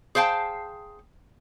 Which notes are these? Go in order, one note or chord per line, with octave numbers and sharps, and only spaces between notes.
G#4 C5 F5 G5 A5